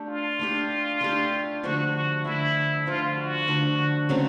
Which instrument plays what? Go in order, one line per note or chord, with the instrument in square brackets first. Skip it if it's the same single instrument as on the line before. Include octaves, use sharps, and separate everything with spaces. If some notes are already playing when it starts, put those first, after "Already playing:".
Already playing: [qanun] A3 D4 G4
[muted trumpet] F4
[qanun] A3 D4 G4
A3 D4 G4
[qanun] D3 F3 A3 [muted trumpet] F#4
[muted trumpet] F#4
[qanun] D3 F3 A3 [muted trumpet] E4
[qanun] D3 F3 A3 [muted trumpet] F4
[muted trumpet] F#4
[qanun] D3 F3 A3
C#3 F#3 A3 C4